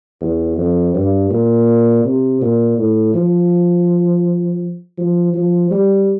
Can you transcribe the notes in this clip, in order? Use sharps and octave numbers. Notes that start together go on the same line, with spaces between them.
E2
F2
G2
A#2
C3
A#2
A2
F3
F3
F3
G3